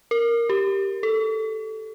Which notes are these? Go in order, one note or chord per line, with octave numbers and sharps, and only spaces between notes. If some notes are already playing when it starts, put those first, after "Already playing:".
A#4
G4
A4